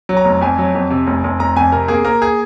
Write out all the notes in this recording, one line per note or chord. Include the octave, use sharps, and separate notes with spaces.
F#3
A#5
F1
F2 G#5
F#3
F2
C3
F1
F1
F1 A#5
F2 G#5
C3 A#4
A#3 G#4
A#3 A#4
G#4